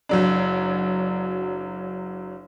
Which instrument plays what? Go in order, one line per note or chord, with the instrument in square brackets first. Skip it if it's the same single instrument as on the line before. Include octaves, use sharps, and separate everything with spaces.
[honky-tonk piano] F#1 F#3 D4